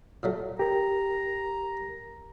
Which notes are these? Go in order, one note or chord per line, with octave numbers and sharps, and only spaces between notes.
A#2 F#3 A3
G4 A#4 A#5